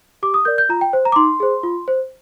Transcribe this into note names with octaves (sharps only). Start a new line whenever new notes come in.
G4 D6
D#6
A#4 D5 G6
G6
F4 A#5
G5
C5
A#5
D6
D#4 C6
G#4 C5
F4
C5